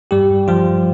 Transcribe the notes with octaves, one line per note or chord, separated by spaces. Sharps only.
G2 G3 G4
G2 F3 F4